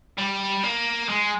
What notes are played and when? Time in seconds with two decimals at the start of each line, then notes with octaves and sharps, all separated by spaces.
0.18 G3
0.63 A#3
1.09 G#3